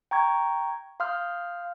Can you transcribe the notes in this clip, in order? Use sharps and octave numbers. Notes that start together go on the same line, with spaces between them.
G5 A#5 C#6 G#6
F5 C6 D#6 F6 G6